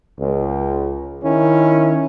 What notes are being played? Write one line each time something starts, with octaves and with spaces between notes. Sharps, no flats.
C#2
D#3 C#4 E4